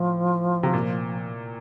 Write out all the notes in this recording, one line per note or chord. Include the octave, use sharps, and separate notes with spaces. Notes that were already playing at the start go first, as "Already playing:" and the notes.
Already playing: A2 F3
C3
A#2